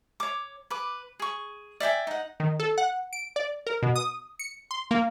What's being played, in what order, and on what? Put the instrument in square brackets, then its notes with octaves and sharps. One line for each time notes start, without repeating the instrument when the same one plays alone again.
[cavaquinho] C#5 D6
B4 D6
G#4 C#6
D5 E5 G5 G#5
D#4 F#5
[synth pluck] D#3
A4
F#5
D7
D5
A#4
B2
D#6
C#7
C6
A#3